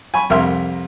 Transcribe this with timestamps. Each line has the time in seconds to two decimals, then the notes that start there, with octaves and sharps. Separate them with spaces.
0.14 G#5 B5 C#6
0.30 C2 F2 A#4 E5 C6 F6